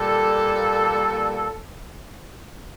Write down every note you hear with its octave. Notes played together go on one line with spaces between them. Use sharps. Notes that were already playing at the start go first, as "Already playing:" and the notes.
Already playing: A#2 G3 A#3 A4